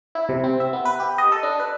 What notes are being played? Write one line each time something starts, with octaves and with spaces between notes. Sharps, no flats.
E4
C3
C4
E5
B3
B4
G4
D#5
A4
D4
B4